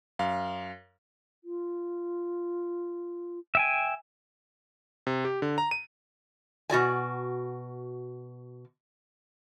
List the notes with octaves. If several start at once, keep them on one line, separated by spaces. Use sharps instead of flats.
F#2 F5
F4
E5 G5 G#5
C3
G4
D3
A#5
D#7
B2 F#4 D5 G#5